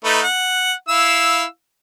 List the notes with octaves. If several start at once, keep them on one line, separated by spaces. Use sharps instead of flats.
A3 D#4 B4
F#5
E4 F5 E6